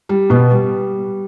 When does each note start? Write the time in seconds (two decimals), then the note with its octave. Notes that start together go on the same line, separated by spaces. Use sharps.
0.09 G3
0.30 B2 B3
0.51 G3